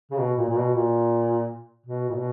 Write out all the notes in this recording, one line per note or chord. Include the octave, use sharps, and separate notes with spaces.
C#3
B2
A#2
A#2
B2
A#2
B2
A#2
B2